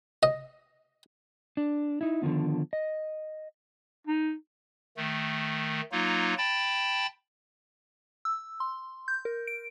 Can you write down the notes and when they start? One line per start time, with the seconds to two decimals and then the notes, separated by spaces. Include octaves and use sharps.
0.23 D#5
1.57 D4
2.01 D#4 E4
2.22 D3 D#3 F3 B3
2.73 D#5
4.07 D#4
4.97 D#3 A3
5.92 F#3 A#3 D#4 F4
6.37 G5 A5 B5 A6
8.25 E6
8.60 C6
9.08 G6
9.25 A#4
9.47 D7